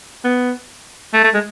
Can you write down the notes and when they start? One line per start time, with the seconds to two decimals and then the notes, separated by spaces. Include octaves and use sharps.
0.24 B3
1.13 A3
1.23 A3
1.34 G#3